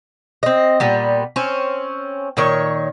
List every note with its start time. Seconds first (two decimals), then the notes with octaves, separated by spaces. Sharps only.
0.43 C4 D#5
0.80 A#2 G3 B3
1.36 C4 C#4
2.37 A#2 D#3 C#5